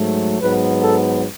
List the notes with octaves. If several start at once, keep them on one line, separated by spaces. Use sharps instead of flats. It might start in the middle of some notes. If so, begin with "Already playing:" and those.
Already playing: G#2 F#3 A3
G#2 F#3 B3 B4
A4